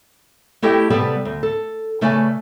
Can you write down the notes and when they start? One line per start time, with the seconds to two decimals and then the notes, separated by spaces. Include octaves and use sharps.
0.62 A3 E4 G4 A4 D#5 G5
0.90 C3 G3 B3 G4 A4 B4
1.25 D2
1.43 A4
2.01 C#3 A3 B4 D5 E5 G#5